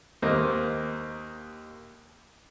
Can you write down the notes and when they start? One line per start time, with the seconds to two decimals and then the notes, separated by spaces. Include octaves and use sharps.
0.22 D#2 A#3 C5 D#5